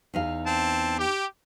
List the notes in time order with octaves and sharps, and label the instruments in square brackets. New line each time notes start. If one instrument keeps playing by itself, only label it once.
[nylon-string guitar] E2 D#4 F5
[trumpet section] C4 A5
G4